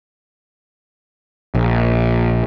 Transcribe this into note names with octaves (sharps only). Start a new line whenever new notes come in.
A#1